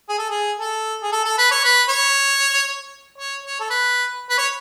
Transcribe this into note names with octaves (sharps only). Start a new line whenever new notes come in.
G#4
A4
G#4
A4
G#4
A4
A4
B4
C#5
B4
C#5
C#5
C#5
A4
B4
B4
C#5